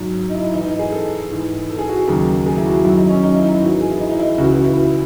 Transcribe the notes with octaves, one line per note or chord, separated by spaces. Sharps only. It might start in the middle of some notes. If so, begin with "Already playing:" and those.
Already playing: G#2 F#3
D#4
E4
G#2 E3 D#4
D#4
G#4
A4
G#2 E3
A4
G#4
F#4
G#4
D#2 C#3 F#3
G#4
E4
F#4
F#2 D#3 F#3 E4
D#4
C#4
D#4
E4
D#4
E4
G#2 E3 F#4
G#4
E4
D#4
D#4
E4
C#2 C#3 E3 F#4
F#4
E4